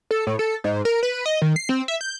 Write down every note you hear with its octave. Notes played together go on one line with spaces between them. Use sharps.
A4
A2
A4
G#2
A#4
B4
D#5
D#3
C7
C4
E5
G6